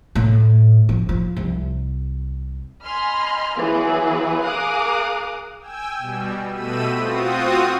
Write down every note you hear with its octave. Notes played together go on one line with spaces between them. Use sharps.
A2
F3
F3
C2
D#5 G#5 B5 C6 F6
E3 F#3 B3 F4 G#4 B4
G#4 A#4 F5 D6 D#6 F#6
G5 G#5 E6
B2 G3
B2 A3 G4 B5 E6 D#7
C4 F4 F#4 D#6